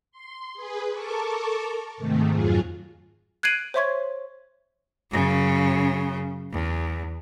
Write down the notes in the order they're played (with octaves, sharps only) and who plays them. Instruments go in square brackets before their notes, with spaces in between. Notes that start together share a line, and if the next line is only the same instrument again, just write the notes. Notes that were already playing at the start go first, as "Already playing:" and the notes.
[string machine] C6
G#4 B4
A4 A#4 A5 C#6 D6
G#2 C3 D#3 A3
F2 G#2 F#3 F4 G#4
[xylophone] F#6 G#6 C7 D7 D#7 F#7
C5 C#5 E5 C6 C#6 G#6
[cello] F#2 C#3
E2